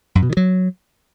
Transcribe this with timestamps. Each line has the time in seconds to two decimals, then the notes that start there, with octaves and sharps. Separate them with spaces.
0.15 F#2
0.22 B2
0.30 D#3
0.37 F#3